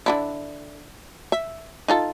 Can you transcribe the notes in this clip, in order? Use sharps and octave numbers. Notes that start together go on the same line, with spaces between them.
D3 D4 E4
E5
D#4 F4 A4